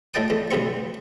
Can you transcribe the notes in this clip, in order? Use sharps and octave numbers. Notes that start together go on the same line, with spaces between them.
A2 A3 D#5 G5 A5 D#6
E2 A3
B1 E2 G2 B3 C4 C#6